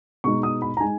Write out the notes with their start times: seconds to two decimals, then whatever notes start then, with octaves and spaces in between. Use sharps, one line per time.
0.24 B2 G#3 D#4 C#6
0.43 D#6
0.62 B5
0.77 A#5
0.80 G#3 D#4 G#5